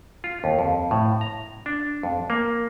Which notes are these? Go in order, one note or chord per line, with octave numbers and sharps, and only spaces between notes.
F4
D#2
F2
A2
A#5
D4
F2
A#3